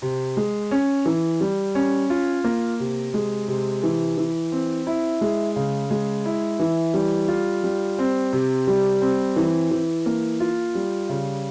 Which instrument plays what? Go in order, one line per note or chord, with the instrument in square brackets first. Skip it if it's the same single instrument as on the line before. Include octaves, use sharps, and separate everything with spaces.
[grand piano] C3
G#3
C#4
E3
G3
C#4
F4
A#3
C3
G#3
C3
E3
E3
C4
E4
G#3
C#3
G#3
E4
E3
G3
F4
G3
C4
C3
G3
C4
E3
E3
A#3
F4
G3
C#3